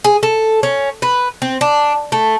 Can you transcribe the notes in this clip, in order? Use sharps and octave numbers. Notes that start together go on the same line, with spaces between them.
G#4
A4
C#4
B4
C4
D4
A3